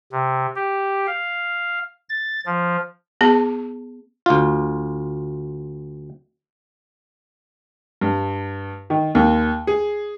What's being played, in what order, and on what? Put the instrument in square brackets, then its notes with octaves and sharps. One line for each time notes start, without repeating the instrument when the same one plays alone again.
[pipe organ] C3
G4
F5
A6
F3
[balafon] B3 G#4 A5
[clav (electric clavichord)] D2 F4
[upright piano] G2
D#3
D#2
G#4